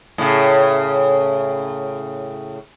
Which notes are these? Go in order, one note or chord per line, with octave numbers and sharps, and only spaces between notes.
A2 C#3